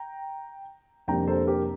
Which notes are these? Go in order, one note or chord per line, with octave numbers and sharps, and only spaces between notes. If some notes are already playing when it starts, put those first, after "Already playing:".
Already playing: G5 A#5
F2 C3 G3 A#3 D4 G5 A#5
A4 C5
G4 A#4